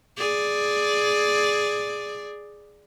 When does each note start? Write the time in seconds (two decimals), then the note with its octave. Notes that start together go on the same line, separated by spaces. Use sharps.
0.18 G#4 D5